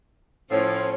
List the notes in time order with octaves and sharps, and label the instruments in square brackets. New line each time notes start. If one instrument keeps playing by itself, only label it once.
[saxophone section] A2 F3 [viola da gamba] C#4 [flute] C#5